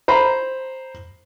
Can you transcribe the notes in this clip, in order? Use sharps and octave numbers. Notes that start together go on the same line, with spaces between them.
C5 A#5 B5